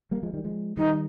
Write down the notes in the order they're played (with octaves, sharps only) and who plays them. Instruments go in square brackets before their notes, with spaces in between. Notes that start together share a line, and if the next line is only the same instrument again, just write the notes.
[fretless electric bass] G3 A#3
F3 G#3
D#3 G3
F3 G#3
[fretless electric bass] D#3 G3 [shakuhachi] D#4